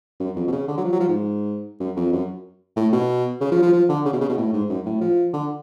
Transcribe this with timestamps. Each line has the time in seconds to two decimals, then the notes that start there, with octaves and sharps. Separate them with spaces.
0.20 F#2
0.36 F2
0.47 B2
0.52 C#3
0.68 D3
0.78 F#3
0.84 F3
0.92 F#3
1.00 F3
1.08 G#2
1.80 F#2
1.97 F2
2.12 F#2
2.76 A2
2.93 B2
3.41 C#3
3.51 F3
3.62 F3
3.73 F3
3.89 D3
4.05 C#3
4.13 B2
4.21 C#3
4.29 B2
4.37 A2
4.53 G#2
4.69 F#2
4.85 A2
5.01 F3
5.33 D3